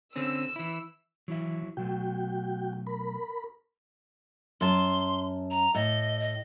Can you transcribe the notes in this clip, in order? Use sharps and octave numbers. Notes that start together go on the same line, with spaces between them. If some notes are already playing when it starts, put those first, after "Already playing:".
D3 C4 C#4 E6
E3 E4
E3 F#3 E4 E5
B2 F#3 A3 F#4 G5
A#4 B5
F#2 A5 C6
A#5
A2 D#5
D#5